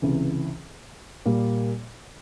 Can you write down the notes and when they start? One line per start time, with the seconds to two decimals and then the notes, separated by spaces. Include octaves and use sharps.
0.02 C#2 C3 E3
1.25 A#2 G3 A#3